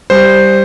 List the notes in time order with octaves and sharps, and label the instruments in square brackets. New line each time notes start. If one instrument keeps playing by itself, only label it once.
[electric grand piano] G3 C5